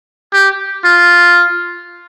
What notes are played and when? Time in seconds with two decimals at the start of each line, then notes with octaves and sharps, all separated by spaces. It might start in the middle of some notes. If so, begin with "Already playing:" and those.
0.33 G4
0.85 F4